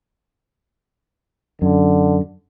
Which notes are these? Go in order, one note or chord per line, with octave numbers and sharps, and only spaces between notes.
F#2 D3